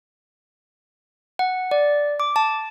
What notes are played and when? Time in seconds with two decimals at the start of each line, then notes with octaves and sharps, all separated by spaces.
1.39 F#5
1.71 D5
2.20 D6
2.36 A5